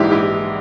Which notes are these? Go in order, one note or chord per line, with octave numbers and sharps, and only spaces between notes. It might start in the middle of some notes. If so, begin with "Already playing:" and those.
Already playing: A#1 G#2 E3 G#3 E4 G4
E4 G4